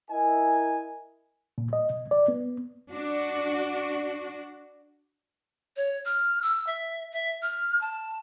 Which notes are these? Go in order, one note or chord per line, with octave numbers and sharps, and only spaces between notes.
E4 A#4 D#5 G#5
A#2
D#5
B2
D5
B3
D4 F#4
C#5
F6
E6
E5
E5
F6
A5